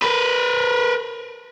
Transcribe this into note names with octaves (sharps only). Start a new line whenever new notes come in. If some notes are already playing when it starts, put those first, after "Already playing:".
A#4 B4